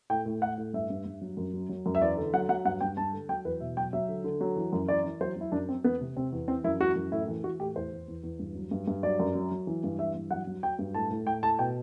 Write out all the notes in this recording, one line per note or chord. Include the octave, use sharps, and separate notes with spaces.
A2 G5
A2
A2 F#5
A2
G2 E5
G2
G2
F#3
F#2
F#3
F#3
F#2
E5
E2 D5
D3
F#3 F#5
F#3 F#5
G2 F#5
G2 G5
G2 A5
D3
F#3 G5
E2 B4
B2 E5
F#3 G5
F#3 E5
D3
D3
F#3
E3
F#2
E3 D5
E3
F#3 C5
F#3 E4
F#2 D4
F#3 C4
E2 B3
C3
C3 C4
E2
E3 C4
F#2 E4
E3 F#4
F#2
A2 E4
E3
E3 F#4
A2 G4
E2 C5
E2
E2
E2
G2
F#3
G2
G2
F#3 D5
F#2
F#3
F#3
E3
G2
E3 E5
G2
F#3 F#5
F#3
F#3 G5
G2
A2 A5
A2
A2 G5
A2 A5
B2 G5